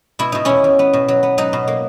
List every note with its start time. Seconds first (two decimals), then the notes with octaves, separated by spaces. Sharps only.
0.19 B2 E4
0.32 B2 D#4
0.45 E2 C#4 E4
0.64 E2
0.79 B3
0.93 B2
1.08 F#3
1.23 B3
1.38 F#3 D#4
1.53 B2
1.67 A#3